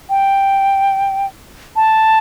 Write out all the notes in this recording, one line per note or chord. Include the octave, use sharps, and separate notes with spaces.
G5
A5